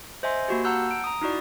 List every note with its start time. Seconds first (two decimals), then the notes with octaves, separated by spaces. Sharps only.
0.23 C5 D#5 E5 G#5 C6
0.48 A#3 F#4 G4
0.64 F#5 A5 A#5 E6 F#6 G6
0.91 D7
1.04 A#5 D#6
1.22 D#4 E4 F#4 D5